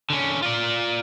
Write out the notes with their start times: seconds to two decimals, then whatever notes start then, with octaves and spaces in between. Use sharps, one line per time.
0.10 D3 C#4
0.43 F4 D5